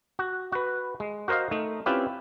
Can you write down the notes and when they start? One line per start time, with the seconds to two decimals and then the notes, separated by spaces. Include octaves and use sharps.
0.19 F#4
0.52 F#4 B4
1.00 G#3
1.28 F#4 A#4 C5 D#5 F5
1.51 A3 D#4
1.86 C4 C#4 E4 F4 G4 B4